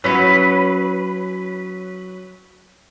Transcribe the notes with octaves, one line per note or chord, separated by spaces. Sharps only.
F#3 C#4 E4 F#4 B4